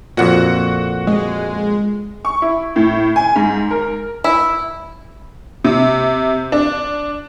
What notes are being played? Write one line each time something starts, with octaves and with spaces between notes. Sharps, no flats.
F2 A#2 F#4 F#5
G#3
C#6
E4
A2
G#5
G#2
A#4
E4
C3
D4